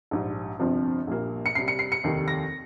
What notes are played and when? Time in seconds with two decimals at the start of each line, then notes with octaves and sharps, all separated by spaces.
0.11 A#1 G#2 G3
0.59 G1 F2 C3 F3 C4
1.07 A#1 A#2 G3 A#3
1.46 C#7
1.55 C2 C3 G3 C7
1.68 C#7
1.79 C7
1.92 C#7
2.04 F1 D#2 D#3 G3
2.28 A#6